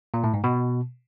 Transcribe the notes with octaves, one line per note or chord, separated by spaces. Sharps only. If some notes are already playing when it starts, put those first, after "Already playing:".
A#2
A2
G#2
B2